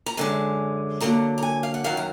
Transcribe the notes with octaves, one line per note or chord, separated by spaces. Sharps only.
A#5
F#2 D3 G#3 G#5
F2 D3 F#3 A#3 A#5
A#5
G#5
F5
F#5
F#2 D#3 F#3 F5
A#5